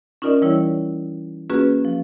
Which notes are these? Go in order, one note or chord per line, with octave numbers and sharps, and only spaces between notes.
C#4 D#4 F4 A#4 D5 D#5
E3 G3 E4 C#5
A#3 C#4 F4 F#4 G#4 B4
F3